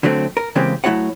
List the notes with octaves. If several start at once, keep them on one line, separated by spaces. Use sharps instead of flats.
D3 F#3 A3 C4
A#4
C#3 E3 G#3 A#3 C4 G4
F#3 A3 E4 F#4 C#5 F#5